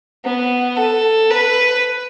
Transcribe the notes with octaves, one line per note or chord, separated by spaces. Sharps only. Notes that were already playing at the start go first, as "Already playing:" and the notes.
B3
A4
B4